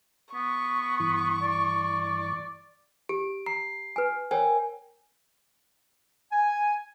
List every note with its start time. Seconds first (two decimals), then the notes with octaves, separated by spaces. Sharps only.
0.34 B3 C#6
1.00 G2 E3
1.42 D5
3.09 G4 D7
3.46 A#5 C7
3.96 B4 G#5
4.31 A#4 C5 C#5 G5 G#5
6.32 G#5